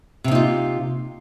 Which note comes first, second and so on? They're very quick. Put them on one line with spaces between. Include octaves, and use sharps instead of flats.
C3 A#3 D#4 F4